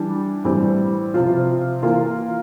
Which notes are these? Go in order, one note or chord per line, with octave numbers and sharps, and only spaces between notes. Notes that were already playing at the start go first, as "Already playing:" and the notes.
Already playing: E3 G3 D4
A2 E3 G3 C4
C3 F3 C4 F4
E3 A#3 F4